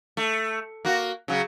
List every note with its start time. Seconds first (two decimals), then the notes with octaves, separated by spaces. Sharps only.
0.17 A3
0.85 A#3 F#4
1.28 C#3 F#3